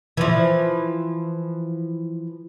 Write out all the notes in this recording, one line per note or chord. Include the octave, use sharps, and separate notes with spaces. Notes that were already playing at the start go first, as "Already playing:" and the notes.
E3 F3